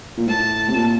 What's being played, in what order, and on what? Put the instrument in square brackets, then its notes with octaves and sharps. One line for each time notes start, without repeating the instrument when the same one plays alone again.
[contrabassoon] A#2
[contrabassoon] A2 [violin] A5
[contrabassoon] C3
A#2